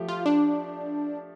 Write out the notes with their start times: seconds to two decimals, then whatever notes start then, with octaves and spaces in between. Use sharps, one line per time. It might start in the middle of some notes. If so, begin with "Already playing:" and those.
Already playing: F3 A3 G4
0.08 F4
0.26 D4